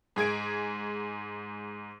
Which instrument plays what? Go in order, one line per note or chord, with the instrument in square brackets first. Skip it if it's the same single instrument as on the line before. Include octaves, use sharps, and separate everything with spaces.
[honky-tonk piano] G#2 G#4 G#6 D7